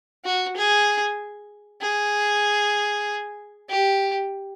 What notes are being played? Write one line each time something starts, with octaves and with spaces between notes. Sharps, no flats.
F#4
G#4
G#4
G4